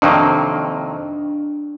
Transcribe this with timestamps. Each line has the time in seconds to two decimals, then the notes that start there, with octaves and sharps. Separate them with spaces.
0.02 F2 C3 D#3 F#3 A#3 D4